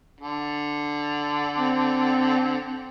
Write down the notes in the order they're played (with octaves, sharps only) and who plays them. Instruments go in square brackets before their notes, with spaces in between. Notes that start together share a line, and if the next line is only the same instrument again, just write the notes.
[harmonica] D3
[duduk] C4